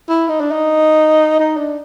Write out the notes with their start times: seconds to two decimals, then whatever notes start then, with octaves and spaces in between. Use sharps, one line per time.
0.09 E4
0.29 D#4
0.41 D4
0.52 D#4
1.40 D#4
1.57 D4